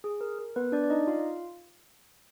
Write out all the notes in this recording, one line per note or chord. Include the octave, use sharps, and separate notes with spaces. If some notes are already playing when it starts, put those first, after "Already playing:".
G#4
A#4
A#4
B3 B4
D4 D5
D5
D#4 D#5
F4 F5